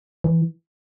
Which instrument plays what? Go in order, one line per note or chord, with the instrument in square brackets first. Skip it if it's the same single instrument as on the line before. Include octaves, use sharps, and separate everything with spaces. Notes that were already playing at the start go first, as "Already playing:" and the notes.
[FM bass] E3